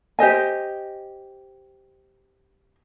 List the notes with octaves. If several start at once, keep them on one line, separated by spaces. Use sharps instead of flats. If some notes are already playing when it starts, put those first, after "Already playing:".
G4 C5 D#5 G#5